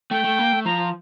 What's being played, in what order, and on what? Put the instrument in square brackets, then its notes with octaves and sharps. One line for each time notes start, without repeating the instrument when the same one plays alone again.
[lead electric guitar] A3 [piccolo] G5
[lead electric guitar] A3
A#3
A3
[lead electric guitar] F3 [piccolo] A#5